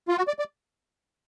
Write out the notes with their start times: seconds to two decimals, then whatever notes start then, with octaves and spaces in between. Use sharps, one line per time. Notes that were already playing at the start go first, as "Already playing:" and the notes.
0.08 F4
0.18 F#4
0.28 D5
0.39 D5